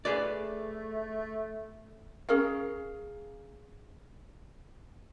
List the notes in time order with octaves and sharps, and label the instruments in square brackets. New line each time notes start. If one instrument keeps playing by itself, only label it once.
[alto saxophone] A3 [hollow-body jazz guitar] G#4 B4 D5
[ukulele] C#4 G#4 A#4 F5